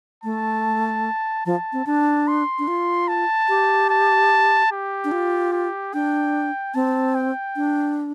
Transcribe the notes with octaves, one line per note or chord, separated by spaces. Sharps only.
A3 A5
F3 A5
C4
D4 A5
C6
D4
F4
A5
G4
A5
G4
D4
F4
G4
D4 G5
C4 A5
G5
D4